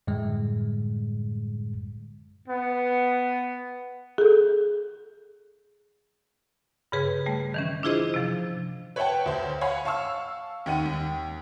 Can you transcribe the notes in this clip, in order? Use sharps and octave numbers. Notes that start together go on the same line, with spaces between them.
F#2 A2 D3 G3 G#3
B3
G#4 A4
G2 C#3 G#4 B4
G3 A3
D#3 E3 C#4
D4 E4 F4 G#4 C5 D#5
C3 F3
B4 C#5 E5 F#5 G5 A5
D2 C5
C#5 F5 F#5 G#5 B5
F5 A5 C#6 E6 F6
D#2 D#3 F#5 D#7
D#2